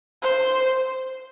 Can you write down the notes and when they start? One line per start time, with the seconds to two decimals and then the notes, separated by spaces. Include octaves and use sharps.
0.23 C5